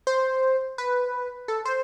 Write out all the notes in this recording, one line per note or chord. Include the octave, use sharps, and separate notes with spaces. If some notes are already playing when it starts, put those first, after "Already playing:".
C5
B4
A4
C5